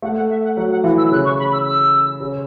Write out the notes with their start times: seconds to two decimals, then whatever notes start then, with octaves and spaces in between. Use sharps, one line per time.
0.02 A3 F#5
0.16 F#5
0.30 E5
0.44 F#5
0.57 F#3 F#5
0.71 F#5
0.84 E3
0.98 E6
1.11 C#3 F#6
1.25 C#6
1.39 B5
1.53 E6
1.66 E6
2.20 C#3